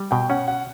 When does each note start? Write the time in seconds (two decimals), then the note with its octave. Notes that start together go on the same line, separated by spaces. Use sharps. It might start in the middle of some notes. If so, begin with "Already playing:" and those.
Already playing: G3
0.11 B2 G5
0.30 C#4 F#5
0.48 F#5